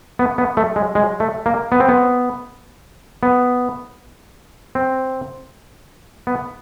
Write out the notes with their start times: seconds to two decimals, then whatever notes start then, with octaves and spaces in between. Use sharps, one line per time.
0.19 B3
0.38 B3
0.57 A3
0.76 G#3
0.95 G#3
1.20 A3
1.46 A#3
1.72 B3
1.80 C4
1.89 B3
3.23 B3
4.75 C4
6.27 B3